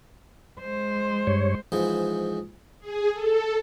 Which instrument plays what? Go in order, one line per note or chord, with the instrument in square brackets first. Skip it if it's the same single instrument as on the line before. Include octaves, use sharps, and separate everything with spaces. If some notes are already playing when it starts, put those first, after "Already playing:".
[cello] G#3 C5
[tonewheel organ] G2 C#5
[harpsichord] G#2 E3 F3
[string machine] G#4
A4